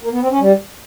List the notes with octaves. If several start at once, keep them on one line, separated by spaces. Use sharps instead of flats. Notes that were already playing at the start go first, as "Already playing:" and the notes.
A#3
B3
C4
C#4
G3